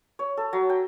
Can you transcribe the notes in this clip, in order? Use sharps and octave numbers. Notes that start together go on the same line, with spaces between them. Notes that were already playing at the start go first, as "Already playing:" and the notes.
C#5
A4
F#3
G5